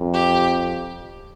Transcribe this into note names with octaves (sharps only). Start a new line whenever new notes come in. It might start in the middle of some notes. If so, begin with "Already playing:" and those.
Already playing: F2
G4